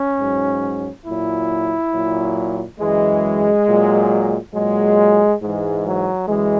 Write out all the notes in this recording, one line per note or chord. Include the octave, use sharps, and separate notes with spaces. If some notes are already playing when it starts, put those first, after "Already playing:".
Already playing: C#4
G#2 F#3
A#2 F#3 E4
A#2 F#3
F#2 E3 G#3
A#2 F#3
A#2 F#3 G#3
G#2 E3 G#3
F#3
F#2 E3 G#3